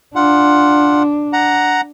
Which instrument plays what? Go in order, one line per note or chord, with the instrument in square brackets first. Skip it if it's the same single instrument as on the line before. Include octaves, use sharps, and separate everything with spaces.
[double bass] D4 [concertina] F4 F#5
[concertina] F#5 A#5